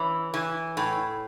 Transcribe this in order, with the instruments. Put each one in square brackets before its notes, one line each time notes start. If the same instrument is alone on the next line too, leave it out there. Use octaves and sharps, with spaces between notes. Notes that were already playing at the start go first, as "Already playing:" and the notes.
Already playing: [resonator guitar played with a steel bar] E3 C#4
E3
A2